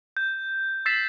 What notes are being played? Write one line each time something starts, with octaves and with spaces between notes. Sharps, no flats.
G6
E6 A6 B6 C7 E7